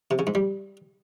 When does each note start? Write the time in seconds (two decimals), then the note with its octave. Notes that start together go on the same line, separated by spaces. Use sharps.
0.11 C3
0.19 C#3
0.27 G#2
0.35 G3